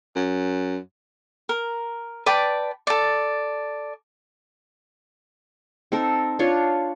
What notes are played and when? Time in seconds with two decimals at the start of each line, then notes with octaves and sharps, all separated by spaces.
0.16 F#2
1.49 A#4
2.26 B4 D5 G5 A5
2.87 A4 D5
5.92 C4 D#4 A4 A#4
6.39 D4 F4 C#5 C6